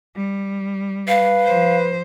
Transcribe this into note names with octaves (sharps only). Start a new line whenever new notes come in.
G3
B4 F5
F3 C5